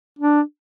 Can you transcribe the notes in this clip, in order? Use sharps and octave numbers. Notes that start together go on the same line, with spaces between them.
D4